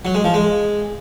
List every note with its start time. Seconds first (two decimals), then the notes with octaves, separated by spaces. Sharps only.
0.05 F#3
0.14 G#3
0.24 F3
0.34 G#3